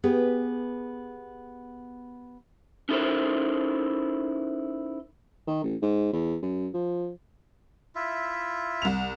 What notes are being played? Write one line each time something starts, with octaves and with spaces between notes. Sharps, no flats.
B3 G4 G#4 B4
C#4 D#4 E4 A4 A#4 C5
D#3
A1
G#2
E2
F#2
F3
E4 F4 E5
C2 F7